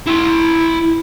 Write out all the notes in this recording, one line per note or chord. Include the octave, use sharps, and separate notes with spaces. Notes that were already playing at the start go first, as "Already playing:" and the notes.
E4 C6